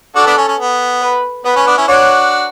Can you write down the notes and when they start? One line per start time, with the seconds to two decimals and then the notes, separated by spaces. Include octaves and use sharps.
0.15 D4 F#4 A4
0.26 B3 D4
0.37 C#4
0.48 C#4
0.59 B3
1.02 B4
1.45 B3 B4
1.56 C#4
1.67 B3 D4
1.77 C#4 E4
1.88 D4 F#4 C#5